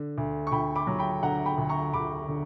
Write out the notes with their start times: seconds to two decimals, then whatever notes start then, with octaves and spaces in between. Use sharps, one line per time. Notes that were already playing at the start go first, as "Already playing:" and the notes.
Already playing: D3
0.18 D2
0.47 C#6
0.52 D2 G5 B5
0.76 B5 D6
0.87 F#3
0.99 G5 B5
1.23 D3 F#5 A#5
1.46 G5 B5
1.58 D2
1.69 A#5 C#6
1.93 D2 B5 D6
2.28 D3